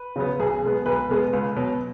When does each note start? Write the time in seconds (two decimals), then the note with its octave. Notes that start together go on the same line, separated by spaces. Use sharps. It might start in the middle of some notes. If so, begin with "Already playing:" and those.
Already playing: B4
0.16 C#3 F#3 B3
0.40 B1 G#4
0.64 B2 G#3 B3
0.86 B1 B4
1.09 B2 G#3 B3
1.33 C#2
1.56 B2 F#3